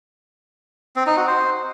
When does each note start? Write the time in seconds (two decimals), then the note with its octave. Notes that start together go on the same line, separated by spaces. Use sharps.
0.96 C4
1.07 D#4
1.17 F#4
1.27 C5